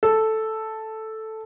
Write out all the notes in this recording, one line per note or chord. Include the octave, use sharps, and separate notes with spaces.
A4